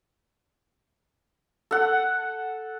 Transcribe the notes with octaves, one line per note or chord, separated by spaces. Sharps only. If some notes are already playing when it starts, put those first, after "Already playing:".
A4 F#5